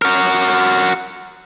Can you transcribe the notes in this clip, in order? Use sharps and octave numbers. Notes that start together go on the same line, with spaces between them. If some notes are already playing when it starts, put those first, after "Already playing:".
F#4 A#4